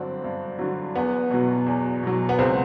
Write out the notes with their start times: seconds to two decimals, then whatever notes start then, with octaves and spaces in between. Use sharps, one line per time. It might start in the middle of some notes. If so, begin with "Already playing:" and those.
Already playing: G2 D3 F#3 C4 D4
0.24 G2
0.59 D3 F#3
0.95 E2 B3
1.30 B2 F#3
1.66 E2
2.03 B2 F#3
2.29 B3
2.38 C#2 C4